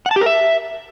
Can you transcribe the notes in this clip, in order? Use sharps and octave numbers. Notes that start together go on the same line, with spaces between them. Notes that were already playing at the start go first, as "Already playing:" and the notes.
F#5
A5
G4
A#4
E5